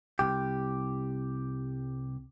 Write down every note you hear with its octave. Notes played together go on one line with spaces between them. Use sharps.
C2 G4